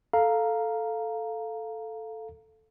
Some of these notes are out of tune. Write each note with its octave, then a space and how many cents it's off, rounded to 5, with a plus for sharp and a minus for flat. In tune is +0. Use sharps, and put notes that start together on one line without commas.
A4 +0 F5 +0 A#5 +0